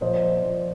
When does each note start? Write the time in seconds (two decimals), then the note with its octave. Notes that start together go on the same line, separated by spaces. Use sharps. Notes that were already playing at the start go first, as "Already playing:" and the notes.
0.01 A#2 F3 C5 D#5
0.43 A#2 F3